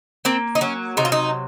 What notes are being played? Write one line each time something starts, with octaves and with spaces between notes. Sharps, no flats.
A#3 C4
D#4
F#3 C#4
C3 D#4
F4
D#4